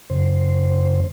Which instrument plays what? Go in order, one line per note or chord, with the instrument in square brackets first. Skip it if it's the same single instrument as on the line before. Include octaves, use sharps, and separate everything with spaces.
[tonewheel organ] F#2 C#3 C5